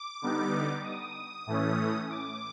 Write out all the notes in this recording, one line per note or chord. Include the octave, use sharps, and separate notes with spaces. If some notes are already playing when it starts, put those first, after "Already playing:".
Already playing: D6
D3 G3 B3 D#4
D#6
A2 E3 A3 C#4
D6